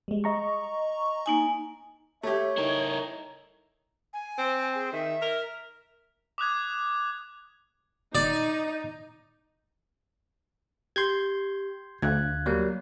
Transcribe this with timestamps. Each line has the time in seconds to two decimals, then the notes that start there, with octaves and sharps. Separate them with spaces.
0.08 G3 G#3
0.24 D#5 A#5 C#6
1.26 A#3 D#4 G#5
2.23 A3 G4 C#5 E5
2.58 D#4 E4 A#4
4.13 G#5
4.38 C4
4.61 G#5
4.75 G#4
4.93 D#3 E5
5.22 A#4
6.38 D6 D#6 F#6 G#6
8.15 D#4 D5
10.96 G4 C6 G6 G#6
12.02 D2 F5 F#6 G#6
12.46 F#3 G3 A#3